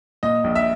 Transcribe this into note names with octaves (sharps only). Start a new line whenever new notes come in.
A#2 D#5
A#1
E5